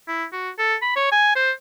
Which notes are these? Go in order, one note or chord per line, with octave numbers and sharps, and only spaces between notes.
E4
F#4
A4
B5
C#5
G#5
C5